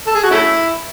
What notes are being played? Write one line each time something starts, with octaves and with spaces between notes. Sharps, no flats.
A4
G#4
F#4
A3 C#4 E4